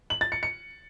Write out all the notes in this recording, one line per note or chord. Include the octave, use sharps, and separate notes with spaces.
F#7
A6
C#7
C#7